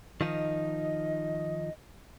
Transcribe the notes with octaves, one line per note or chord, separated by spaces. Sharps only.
D#3 F3 D#4 D#5